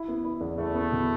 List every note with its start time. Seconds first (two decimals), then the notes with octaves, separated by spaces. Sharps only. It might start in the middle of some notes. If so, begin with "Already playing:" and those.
Already playing: E4
0.08 B3
0.25 E4
0.41 E2
0.58 E2 A3
0.74 B3
0.92 B2